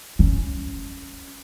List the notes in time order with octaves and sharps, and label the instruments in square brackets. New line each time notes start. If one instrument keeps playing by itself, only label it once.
[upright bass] C#4